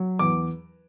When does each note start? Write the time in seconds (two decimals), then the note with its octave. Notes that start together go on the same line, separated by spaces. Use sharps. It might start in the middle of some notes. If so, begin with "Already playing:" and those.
Already playing: F#3
0.19 E2 D6